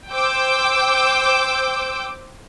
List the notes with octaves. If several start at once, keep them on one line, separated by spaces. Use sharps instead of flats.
C5 G5 D6 E6 G6